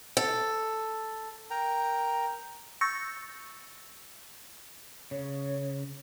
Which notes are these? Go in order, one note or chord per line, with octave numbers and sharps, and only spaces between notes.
A4
A#4 G5 A#5
C#6 E6 G6 A6 A#6 C#7
C#3 C#5